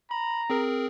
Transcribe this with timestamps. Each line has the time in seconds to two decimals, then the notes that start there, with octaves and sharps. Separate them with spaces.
0.11 A#5 B5
0.50 C4 G#4 A#4